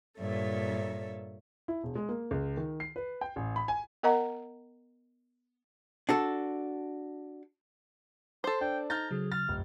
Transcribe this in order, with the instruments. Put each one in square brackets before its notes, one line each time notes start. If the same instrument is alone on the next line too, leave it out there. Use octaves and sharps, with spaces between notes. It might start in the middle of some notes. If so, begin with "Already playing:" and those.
[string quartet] G2 A#2 A4 C#5 E5
[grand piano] E4
E1
G#3
A#3
C#2
D#3
C7
B4
G5
A1
B5
G#5
[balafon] B3 A#4 D#5 F#5 A#5
[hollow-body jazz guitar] D4 F#4 A4
[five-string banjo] A4 C5 [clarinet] C6
[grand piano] D4 [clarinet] G5
[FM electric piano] D#4 [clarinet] A#5 [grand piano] F6 G6 A6
[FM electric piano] C#3 F#3 [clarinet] G#4
[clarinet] F6 [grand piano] A6
[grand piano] F1 [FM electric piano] B1 F#2